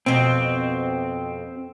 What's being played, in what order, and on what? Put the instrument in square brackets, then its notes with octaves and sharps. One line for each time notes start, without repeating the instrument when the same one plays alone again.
[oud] F2 B2 [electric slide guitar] C4